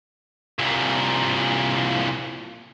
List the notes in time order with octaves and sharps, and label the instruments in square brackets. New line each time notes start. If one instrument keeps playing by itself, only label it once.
[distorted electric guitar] C2 A#2